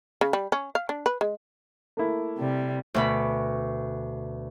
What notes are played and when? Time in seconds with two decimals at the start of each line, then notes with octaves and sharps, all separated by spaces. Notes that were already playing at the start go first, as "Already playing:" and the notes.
0.21 C#3
0.33 G3
0.52 C#4
0.75 F5
0.89 D4
1.06 B4
1.21 G#3
1.97 A3 A#3 E4
2.37 C3 G3
2.94 D2 B2 B5